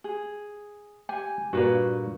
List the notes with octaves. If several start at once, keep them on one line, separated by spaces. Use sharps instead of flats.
G#4
G4 G#5
G2 A#2 A#3 F#4 B4